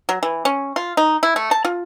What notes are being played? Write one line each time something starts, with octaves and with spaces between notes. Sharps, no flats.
F#3
E3
C#4
F4
D#4
E4
A3
A5
F4